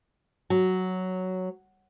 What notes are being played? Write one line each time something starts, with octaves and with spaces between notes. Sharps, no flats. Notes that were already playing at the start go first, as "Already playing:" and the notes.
F#3